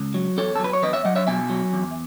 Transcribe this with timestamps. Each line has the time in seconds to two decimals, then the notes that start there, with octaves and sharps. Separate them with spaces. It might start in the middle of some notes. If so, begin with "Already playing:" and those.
Already playing: C#2
0.14 F#3
0.37 E2 A4 C#5
0.56 A4
0.59 F#3
0.64 B4
0.73 C#5
0.82 E2 B4 D#5
0.93 C#5 E5
1.05 F#3 D#5 F#5
1.15 C#5 E5
1.27 B2 E5 G#5
1.50 F#3
1.73 E2